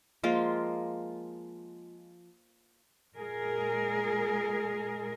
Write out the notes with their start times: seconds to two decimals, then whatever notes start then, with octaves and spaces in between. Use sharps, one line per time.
0.24 F3 G#3 A#3 F4
3.15 A#2 G#3 G#4 A#4